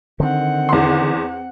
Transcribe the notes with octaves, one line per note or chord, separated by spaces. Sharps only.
D3 D#3 C4 F#5
E2 C6